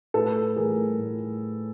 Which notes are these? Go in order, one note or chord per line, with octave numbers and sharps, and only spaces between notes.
A2 A4 B4
E3 A3 G#4 A#4
A2